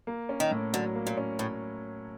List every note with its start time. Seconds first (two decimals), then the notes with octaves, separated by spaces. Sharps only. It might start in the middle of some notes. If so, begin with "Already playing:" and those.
0.07 A#3
0.29 C#4
0.40 D#3
0.51 A2
0.73 D3 F#3
0.95 A#3
1.07 A#2
1.17 C#4
1.39 A2